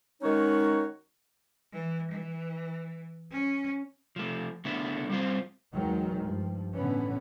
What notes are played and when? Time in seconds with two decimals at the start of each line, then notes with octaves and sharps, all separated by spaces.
0.22 D#3 G#3 C#4 D#4 F#4 C#5
1.73 E3
2.11 E3
3.31 C#4
4.16 F3 A3
4.65 D3 A3 B3 E4
5.10 G3 C4 F4 C5
5.73 E2 D#3 F#3 G#3
6.22 G2 F3
6.74 A2 D3 E3 B3 C#4